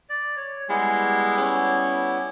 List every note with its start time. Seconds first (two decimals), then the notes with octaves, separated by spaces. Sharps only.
0.09 D5
0.37 C#5
0.69 G3 G#3 B3 E4
1.38 C#4